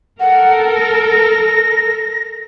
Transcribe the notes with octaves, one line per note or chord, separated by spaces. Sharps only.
A4 A#4 F#5
A#6